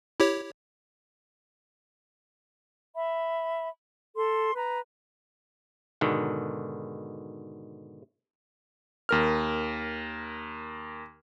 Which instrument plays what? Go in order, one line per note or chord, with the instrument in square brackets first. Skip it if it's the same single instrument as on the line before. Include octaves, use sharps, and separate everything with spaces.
[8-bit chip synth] E4 G4 C#5
[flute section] E5 B5
A4 C6
B4 A#5
[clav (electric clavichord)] G#2 B2 D3 D#3
[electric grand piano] D#2 A#4 F6